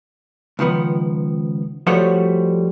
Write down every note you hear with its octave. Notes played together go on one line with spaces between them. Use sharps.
C#2 D#3 F3 B3
F3 G3 A3 F#4 C5 C#5